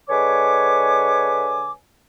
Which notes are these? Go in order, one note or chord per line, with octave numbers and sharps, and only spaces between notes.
D3 G#3 B4 C#5 G#5 D6